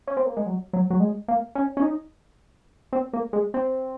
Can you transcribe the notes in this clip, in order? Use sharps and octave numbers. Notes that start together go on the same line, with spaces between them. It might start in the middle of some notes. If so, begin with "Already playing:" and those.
C#4
C4
A#3
G#3
F#3
F#3
F#3
G#3
A#3
C#4
C#4
D#4
C4
A#3
G#3
C4